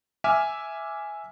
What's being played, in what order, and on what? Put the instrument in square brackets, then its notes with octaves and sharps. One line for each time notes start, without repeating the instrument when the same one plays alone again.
[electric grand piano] E5 G#5 D6 F6